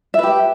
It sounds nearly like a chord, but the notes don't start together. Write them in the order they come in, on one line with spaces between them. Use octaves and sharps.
E5 B4 G4